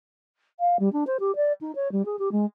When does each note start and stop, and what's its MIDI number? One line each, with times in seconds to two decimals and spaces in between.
0.59 0.77 77
0.79 0.91 55
0.92 1.04 62
1.06 1.17 72
1.19 1.35 67
1.35 1.52 74
1.61 1.71 63
1.75 1.91 73
1.91 2.04 55
2.05 2.16 68
2.19 2.31 67
2.31 2.45 56